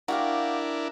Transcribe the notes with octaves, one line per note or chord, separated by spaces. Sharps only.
D4 E4 F#4 G4 A#4 F5